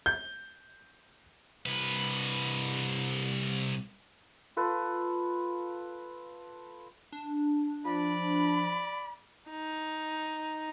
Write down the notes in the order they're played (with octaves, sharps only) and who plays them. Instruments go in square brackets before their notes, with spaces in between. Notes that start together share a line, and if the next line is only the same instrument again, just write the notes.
[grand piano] G6
[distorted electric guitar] C2 B4
[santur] F4 A4 B4
[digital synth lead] D4
[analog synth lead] F3 [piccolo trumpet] D5 [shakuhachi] B5
[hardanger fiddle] D#4